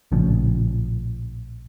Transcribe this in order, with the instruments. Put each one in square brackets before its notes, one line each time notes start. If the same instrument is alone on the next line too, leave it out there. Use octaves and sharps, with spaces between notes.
[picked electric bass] A#1 A2 C#3 F3